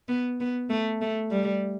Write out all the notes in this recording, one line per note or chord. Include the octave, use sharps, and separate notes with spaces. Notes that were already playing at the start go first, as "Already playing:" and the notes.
B3
B3
A3
A3
G3